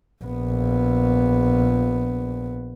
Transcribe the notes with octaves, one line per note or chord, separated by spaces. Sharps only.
A#1 B3